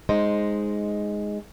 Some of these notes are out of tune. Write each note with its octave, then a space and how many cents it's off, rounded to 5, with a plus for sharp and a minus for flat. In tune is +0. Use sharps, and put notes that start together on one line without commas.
G#3 +0 D#4 +0 C5 +0